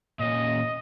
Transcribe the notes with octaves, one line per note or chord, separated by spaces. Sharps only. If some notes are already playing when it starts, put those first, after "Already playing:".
A#2 C#4 D#5